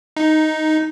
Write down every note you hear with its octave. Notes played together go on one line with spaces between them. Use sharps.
D#4